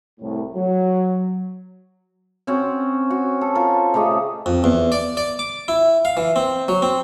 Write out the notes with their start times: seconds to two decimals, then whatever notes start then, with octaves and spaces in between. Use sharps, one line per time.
0.20 C2 A2
0.55 F#3
2.47 C4 C#4 F#4
3.10 F#4
3.41 A4
3.55 F4 A4 A#4
3.94 C#3 A3 G4 D#5
4.46 F2
4.64 E2
4.92 D5
5.17 D5
5.39 D6
5.68 E4
6.05 F5
6.17 E3
6.36 C4
6.68 F#3
6.82 C4